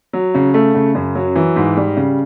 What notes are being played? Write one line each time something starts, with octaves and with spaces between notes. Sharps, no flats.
F#3
C#3
A3
C#3
F#2
F#3
E3
G#2
G3
C#3